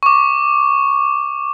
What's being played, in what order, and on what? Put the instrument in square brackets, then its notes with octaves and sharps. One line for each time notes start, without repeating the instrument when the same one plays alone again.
[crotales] C#6 D6